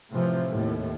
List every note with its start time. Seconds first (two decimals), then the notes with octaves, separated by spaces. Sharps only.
0.12 A2 C3 E3 F3
0.51 D#2 A2